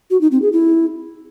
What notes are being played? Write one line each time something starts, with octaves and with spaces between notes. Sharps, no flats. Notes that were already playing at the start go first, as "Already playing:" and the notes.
F#4
D#4
C4
G#4
E4